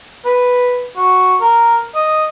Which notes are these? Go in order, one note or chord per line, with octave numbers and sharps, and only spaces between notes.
B4
F#4
A#4
D#5